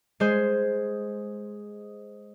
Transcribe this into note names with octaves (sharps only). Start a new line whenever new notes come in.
G#3 G#4 C5